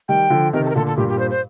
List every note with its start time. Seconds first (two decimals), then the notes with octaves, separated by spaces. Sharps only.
0.09 D#3 G3 G5
0.30 D3 F3
0.53 C3 D#3 A#4
0.65 A4
0.70 A#4
0.75 A#2 D3 A4
0.87 A4
0.97 G2 A#2 G4
1.09 G4
1.19 C5
1.31 C5